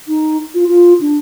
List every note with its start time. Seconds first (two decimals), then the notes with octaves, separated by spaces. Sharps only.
0.08 D#4
0.54 F4
0.68 F4
1.01 D4